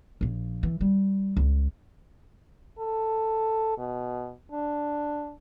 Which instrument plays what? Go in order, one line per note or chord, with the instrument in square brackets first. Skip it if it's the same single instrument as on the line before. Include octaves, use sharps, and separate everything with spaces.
[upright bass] A#1 F3
E3
G3
C#2
[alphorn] A4
B2
D4